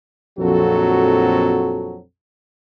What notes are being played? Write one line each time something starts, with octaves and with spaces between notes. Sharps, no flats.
A#1 F2 F#3 C4 F#4 A4